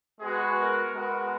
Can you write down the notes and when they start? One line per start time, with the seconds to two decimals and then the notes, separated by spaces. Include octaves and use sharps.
0.20 G#3 B3 F#4 G#4
0.58 A#4
0.95 G#3 B3 F#4 A#4